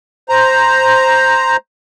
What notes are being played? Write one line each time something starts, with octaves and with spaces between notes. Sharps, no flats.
C5 A#5